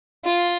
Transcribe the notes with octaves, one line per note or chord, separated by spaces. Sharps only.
F4